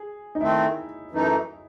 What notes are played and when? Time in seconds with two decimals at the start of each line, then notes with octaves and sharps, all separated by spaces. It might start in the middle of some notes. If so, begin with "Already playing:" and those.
Already playing: G#4
0.35 D#4
0.41 D#3 A3 C4 E4
1.11 F#2 E3 A3 D#4